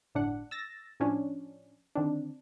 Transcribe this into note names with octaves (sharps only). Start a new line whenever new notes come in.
G1 A2 D4 F#5
E6 A6 A#6
A2 F3 C#4 D4
D3 D#3 C4 D4